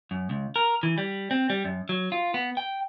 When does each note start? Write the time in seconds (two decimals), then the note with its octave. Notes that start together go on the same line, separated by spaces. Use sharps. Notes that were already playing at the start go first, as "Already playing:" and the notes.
0.11 F#2
0.30 C#2
0.56 A#4
0.83 E3
0.98 G3
1.31 C4
1.50 G3
1.65 F#2
1.89 F#3
2.12 F4
2.34 B3
2.57 G5